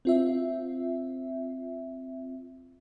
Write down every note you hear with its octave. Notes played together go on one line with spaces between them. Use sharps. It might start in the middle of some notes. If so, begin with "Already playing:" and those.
C4 F4 E5